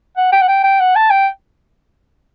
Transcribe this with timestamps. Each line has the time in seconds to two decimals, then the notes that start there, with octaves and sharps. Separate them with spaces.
0.17 F#5
0.33 G5
0.42 F#5
0.48 G5
0.64 G5
0.80 F#5
0.96 A5
1.11 G5